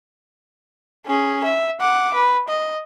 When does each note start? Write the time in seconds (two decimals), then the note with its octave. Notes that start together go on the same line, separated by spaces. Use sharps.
1.06 C#4 G#4
1.44 E5
1.80 F#5 D6
2.14 B4
2.48 D#5